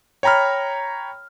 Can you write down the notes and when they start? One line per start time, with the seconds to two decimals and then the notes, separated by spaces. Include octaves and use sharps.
0.23 C#5 G5 A#5 B5 F6